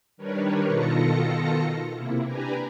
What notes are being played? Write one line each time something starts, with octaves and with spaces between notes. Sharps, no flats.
D#3 G3 D4 A#4 B4 C#5
B2 D#3 F4 A4 A#6 C#7
C3 A#3 E4
D4 G4 B4 G#5 A#5